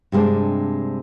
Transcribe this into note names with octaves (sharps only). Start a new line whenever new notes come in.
G2 C3 G#3 C4 D4